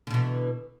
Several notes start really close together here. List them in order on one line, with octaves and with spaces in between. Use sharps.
D3 B2 E3